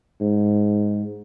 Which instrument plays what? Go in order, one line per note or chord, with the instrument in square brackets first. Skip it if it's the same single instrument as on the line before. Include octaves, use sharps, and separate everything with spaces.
[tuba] G#2